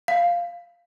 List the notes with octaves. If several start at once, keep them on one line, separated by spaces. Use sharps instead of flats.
F5